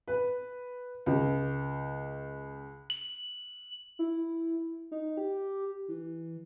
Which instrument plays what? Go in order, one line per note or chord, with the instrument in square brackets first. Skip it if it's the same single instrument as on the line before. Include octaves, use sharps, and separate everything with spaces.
[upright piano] B4
C#2
[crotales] F#7
[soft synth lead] E4
D#4
G4
E3